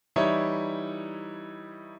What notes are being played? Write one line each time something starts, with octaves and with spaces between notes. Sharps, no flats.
E3 G3 D#4 E4 C#5 E5